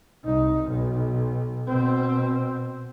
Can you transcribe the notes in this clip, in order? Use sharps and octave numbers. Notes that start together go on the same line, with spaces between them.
C2 D#4
B1
B2 C4